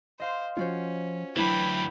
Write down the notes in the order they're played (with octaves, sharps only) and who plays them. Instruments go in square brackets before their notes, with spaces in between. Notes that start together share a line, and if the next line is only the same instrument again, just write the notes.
[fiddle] C5 [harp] D#5 F5 C6
[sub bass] F3 [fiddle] C#4 [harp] F4 F#4 C5
[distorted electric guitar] D2 E3 [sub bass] F#3 [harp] D4 E4 B4 [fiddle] G5 B5